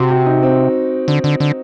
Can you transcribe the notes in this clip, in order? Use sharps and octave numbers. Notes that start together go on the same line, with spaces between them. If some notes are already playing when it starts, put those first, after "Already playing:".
Already playing: C3 F#4
F#4
D#4
C4
D3
D3
D3